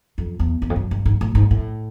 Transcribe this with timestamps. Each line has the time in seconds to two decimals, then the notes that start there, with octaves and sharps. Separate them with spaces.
0.18 F2
0.40 E2
0.62 E2
0.70 F2
0.76 F#2
0.91 G2
1.06 G#2
1.21 A2
1.35 G#2
1.51 A2